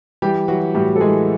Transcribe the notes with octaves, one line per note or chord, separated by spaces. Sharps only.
E3 G3 G4
E3 F#3 F#4
A2 G3 G4
A4
E3 G#3 G#4